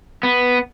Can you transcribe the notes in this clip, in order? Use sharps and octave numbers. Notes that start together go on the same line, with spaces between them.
B3